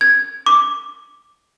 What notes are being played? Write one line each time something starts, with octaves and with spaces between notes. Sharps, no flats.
G#6
D6